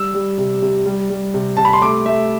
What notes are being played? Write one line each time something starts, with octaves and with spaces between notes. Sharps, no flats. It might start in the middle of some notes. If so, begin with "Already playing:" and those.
Already playing: G3 E6
G3
C3
C3
G3
G3
C3
C3 A5
B5
C6
A3 D6
A3 E5